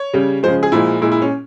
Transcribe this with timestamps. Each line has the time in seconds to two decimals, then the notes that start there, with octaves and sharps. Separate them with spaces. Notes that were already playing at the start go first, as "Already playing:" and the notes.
Already playing: C#5
0.14 C#3 G3
0.43 C#3 F3 G#3 C5
0.63 G#4
0.72 A#2 F3 G#3 E4
1.01 A#2 G#3 E4
1.12 E4
1.22 C#4